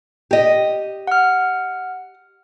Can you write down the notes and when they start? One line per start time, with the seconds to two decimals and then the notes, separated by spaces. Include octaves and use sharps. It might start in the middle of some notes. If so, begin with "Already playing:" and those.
0.31 G4 D#5
1.07 F#5 F6